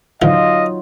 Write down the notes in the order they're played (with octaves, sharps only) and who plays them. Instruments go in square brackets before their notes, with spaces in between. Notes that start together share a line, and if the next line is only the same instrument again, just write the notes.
[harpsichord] A2 D3 F3 [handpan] F#3 D#4 F4 [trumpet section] D#5 F5